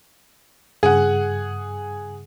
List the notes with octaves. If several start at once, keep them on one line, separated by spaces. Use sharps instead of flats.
G2 C#3 G#4 F#5